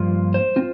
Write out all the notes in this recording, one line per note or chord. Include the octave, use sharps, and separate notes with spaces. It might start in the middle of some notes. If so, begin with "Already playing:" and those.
Already playing: G2 F3 A#3 F4
C5
C4 F4